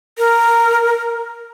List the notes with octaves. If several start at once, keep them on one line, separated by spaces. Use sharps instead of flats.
A#4